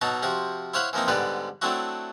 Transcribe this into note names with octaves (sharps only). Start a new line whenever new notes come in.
B2 F#3 D#4 F#4 A5
C3 F3 F#4
E4 C5 C#5 F5 F#5 B5
E3 F3 A#3 C4 D#4
G#2 D3 G3 B3 B4 D5
F#3 A3 C4 D4 E4 F#4